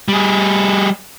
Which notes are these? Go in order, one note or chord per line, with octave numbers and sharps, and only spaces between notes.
G3 G#4